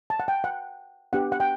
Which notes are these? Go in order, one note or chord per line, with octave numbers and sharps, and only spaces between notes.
A5
F#5
G5
F#5
B3 D4 G4 F#5
F#5
G5